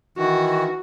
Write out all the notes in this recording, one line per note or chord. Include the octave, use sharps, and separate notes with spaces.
D#3 E3 F#4